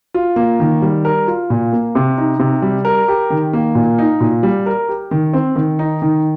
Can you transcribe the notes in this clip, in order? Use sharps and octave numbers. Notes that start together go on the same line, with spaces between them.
F4
A#3
D#3
G3
A#4
F4
A#2
A#3
C3
D#4
C3
G3
A#4
G4
D#3
A#3
A#2
D#4
A#2
G3
A#4
G4
D#3
C4
D#3
D#4
D#3